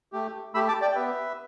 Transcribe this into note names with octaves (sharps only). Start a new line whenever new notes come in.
A3 G4
A3 G4 B5 E6
A5 D6
D5 G5
G5
B3 G4 B4 E5